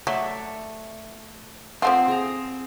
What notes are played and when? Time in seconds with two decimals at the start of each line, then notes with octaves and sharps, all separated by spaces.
0.07 F#3 A3 D5 E5
1.82 F3 A3 C4 F4 F#5
2.08 G#4 A#5